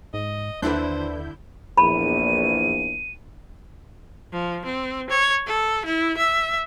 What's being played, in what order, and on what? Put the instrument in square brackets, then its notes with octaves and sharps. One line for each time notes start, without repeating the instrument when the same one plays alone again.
[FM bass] G#2 [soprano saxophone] D#5
[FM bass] D#2 [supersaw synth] D3 E4 G6 [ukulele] D4 B4 [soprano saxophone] C5
[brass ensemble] A#1 E2 [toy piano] B5 [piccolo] D#7
[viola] F3
C4
C#5
A4
E4
E5